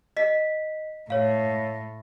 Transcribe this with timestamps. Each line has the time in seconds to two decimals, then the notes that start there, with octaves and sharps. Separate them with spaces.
0.17 D#5 B6
1.10 A2 C#5 F5